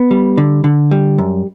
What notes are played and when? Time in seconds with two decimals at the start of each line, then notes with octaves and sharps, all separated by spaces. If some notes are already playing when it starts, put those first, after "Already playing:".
Already playing: B3
0.11 G3
0.38 D3
0.64 D3
0.91 G3
1.18 F#2